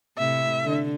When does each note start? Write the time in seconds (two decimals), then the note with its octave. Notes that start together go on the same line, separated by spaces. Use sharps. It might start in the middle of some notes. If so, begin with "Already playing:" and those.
0.17 A2 C3 E4 E5
0.64 D3